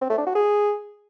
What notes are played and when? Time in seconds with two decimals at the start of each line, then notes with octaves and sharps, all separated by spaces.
0.02 C4
0.10 A3
0.18 D4
0.27 F#4
0.35 G#4